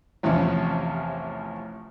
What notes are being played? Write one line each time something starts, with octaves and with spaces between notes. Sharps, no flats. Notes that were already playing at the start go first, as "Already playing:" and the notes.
A1 E2 C3 F3 C#4